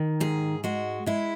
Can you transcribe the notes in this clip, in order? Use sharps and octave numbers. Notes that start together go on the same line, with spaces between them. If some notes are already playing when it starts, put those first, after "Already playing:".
Already playing: D#3
G#2 G#4
G#3 F#4
G#3 E4